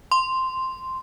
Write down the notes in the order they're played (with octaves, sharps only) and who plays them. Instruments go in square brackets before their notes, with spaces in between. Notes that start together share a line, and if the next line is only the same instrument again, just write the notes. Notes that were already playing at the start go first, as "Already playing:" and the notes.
[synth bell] C6